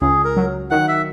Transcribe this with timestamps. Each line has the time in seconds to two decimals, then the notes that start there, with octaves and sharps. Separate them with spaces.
0.01 C#2 G#4
0.25 A#4
0.37 F#3
0.71 D#3 F#5
0.88 E5